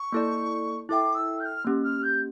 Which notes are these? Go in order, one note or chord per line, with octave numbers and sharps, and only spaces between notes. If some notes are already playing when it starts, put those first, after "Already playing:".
Already playing: C#6
A#3 E4 A4 D5
E4 A4 E5 G5 D6
E6
G6
F6
A#3 C#4 G4
F6
G6